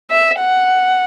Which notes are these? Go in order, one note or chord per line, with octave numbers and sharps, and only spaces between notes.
E5
F#5